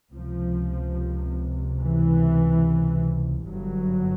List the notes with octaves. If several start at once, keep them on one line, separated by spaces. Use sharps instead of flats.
C#2 C3 F3
E3
G1 G2 F#3